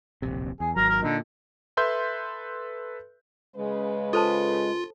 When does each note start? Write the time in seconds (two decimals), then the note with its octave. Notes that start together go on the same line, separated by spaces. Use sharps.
0.22 D1 A#1 C3
0.60 E2 G#4
0.76 G#1 F#3 A#4 A#5
0.89 A#4
1.03 A#2 D3 D#4
1.77 A4 B4 E5 C6 G6
3.56 C#3 G#3 B4
4.13 F4 A4 C5 A5